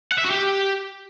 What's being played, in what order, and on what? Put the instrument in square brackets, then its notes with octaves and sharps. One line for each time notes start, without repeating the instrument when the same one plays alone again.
[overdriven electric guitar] F#5
E5
F#4
G4